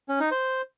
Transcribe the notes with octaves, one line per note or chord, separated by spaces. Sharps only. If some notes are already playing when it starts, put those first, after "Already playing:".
C#4
D#4
C5